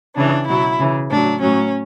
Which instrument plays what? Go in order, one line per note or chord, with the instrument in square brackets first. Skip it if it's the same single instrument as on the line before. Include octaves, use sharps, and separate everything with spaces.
[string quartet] C#3 E3 D4
B2 F#3 E4
C#3 E3
A2 F#3 D4
A2 F#3 C#4